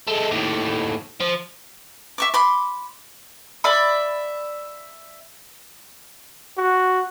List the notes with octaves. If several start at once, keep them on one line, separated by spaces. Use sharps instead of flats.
G#3 A3
D#2 A2
F3
E5 C#6 D6
B5 C6 D6
D5 E5 B5
F#4